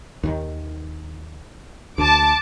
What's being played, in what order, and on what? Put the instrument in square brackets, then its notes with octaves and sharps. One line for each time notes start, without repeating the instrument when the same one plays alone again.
[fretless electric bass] D#2 D#3
[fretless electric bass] D2 [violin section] A5 D6